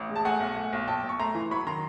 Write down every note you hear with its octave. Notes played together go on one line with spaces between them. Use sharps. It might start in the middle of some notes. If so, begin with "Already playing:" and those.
Already playing: A1
G#3
A5
A3 F#5 G#5
B1
A3
B1
B1 G5 A5
B1
C#6
A3 A#5 C6
E3
F#3 B5 C#6
D#3 A#5 C6